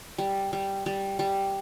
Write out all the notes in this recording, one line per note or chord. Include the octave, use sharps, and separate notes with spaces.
G3
G3
G3
G3